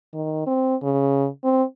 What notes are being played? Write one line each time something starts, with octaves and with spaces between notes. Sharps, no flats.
D#3
C4
C#3
C4